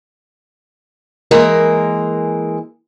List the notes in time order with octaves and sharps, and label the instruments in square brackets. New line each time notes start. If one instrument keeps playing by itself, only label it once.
[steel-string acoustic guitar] E3 G#3 A#3 A#4